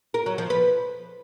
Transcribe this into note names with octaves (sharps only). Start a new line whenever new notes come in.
A#4
F#3
F3
B4